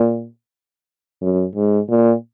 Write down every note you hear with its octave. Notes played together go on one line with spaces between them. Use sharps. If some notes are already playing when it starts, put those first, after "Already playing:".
Already playing: A#2
F#2
G#2
A#2